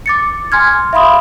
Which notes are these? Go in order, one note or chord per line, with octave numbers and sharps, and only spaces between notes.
D6 A6 C#7
G#5 C6 F6 G#6
E5 F5 B5 C6 D#6